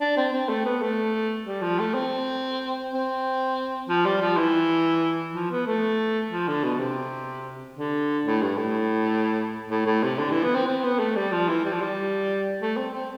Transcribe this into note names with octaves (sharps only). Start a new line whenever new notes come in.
D4
C4
C4
A3
B3
A3
G3
F3
A3
C4
C4
F3
G3
F3
E3
F3
B3
A3
F3
D3
B2
C3
D3
A2
G2
A2
A2
A2
C3
D3
E3
B3
C4
C4
B3
A3
G3
F3
E3
G3
F3
G3
A3
C4
C4